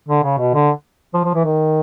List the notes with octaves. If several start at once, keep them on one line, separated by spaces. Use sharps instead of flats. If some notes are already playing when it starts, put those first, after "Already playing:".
D3
C#3
B2
D3
F3
F3
E3
D#3